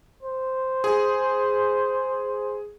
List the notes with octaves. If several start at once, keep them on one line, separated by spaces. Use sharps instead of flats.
C5
G#4